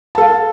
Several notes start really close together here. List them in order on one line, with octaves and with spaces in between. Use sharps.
A5 A4 F5